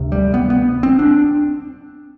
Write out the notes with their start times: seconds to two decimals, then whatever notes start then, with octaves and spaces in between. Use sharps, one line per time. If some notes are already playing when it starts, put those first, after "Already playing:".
Already playing: D2 C3
0.12 G3
0.34 B3
0.50 B3
0.83 C4
0.99 D4